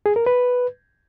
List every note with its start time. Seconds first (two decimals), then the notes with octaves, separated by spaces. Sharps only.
0.06 G#4
0.16 A#4
0.26 B4